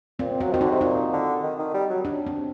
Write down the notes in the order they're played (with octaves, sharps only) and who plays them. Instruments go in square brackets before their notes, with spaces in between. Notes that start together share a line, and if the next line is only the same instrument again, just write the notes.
[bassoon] A#2 [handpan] C4
[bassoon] F#3 [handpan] C4
[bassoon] D#3 [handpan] F#4
[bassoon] D3 [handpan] D#4
[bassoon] C3
[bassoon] A#2 [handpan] D#4
[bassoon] D3
D#3
D#3
G3
F#3
[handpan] D4
C4